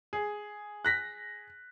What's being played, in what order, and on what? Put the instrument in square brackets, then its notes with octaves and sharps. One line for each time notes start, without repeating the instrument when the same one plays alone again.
[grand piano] G#4
[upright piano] F#6 A#6 B6